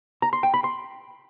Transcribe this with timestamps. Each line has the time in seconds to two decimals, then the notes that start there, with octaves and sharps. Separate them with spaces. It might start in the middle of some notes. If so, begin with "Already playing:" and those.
0.22 A#5
0.33 C6
0.43 G5
0.54 B5
0.64 C6